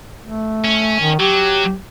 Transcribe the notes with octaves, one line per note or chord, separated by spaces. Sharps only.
A3
C#4
D#3
F#3 G4